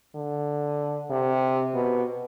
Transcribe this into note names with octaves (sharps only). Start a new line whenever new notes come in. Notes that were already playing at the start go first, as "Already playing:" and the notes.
D3
C3
B2